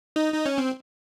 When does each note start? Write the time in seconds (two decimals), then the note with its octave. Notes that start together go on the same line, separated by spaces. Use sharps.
0.16 D#4
0.34 D#4
0.46 C#4
0.58 C4